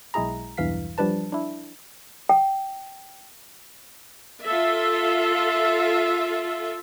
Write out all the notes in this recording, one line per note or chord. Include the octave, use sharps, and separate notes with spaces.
B1 G#3 E4 G#4 A#5
B1 E2 G2 E3 F5 B6
F3 G3 D4 B4 A5
D4 E4
G5
F4 A4 E5